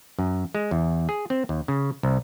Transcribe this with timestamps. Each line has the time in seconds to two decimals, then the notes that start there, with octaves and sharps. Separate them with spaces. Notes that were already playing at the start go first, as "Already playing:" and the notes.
0.19 F#2
0.55 G#3
0.71 E2
1.09 G#4
1.30 C4
1.49 D#2
1.68 C#3
2.03 C2